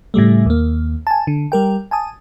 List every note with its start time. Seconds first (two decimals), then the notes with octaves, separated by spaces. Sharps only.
0.14 A2 C#3 G3 A3
0.46 D#2 A#3
1.07 G#5 A5
1.27 D3
1.52 G3 A#4 G5
1.91 G#5 A5 D#6